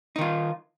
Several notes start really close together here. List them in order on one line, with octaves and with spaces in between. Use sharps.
D#4 D#3 F4